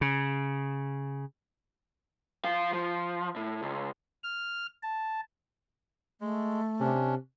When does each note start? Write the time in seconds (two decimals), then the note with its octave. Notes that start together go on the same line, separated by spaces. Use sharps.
0.01 C#3
2.44 F3 F5
2.73 F3
3.36 A2
3.63 C#2
4.23 F6
4.83 A5
6.21 G#3 A3
6.80 C3 C#4 D4